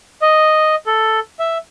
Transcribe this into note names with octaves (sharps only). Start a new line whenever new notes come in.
D#5
A4
E5